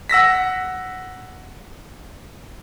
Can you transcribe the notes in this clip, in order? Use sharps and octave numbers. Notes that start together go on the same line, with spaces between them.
F#5 E6 A#6 B6